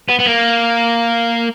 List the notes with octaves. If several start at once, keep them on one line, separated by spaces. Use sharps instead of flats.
B3
B3
A#3